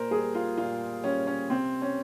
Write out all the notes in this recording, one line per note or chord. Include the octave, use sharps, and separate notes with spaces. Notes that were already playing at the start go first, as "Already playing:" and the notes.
Already playing: A#2 A#4 C5
G3 G#4
F4
A#2 F4
G3 C#4
C#4
C3 C4
C#4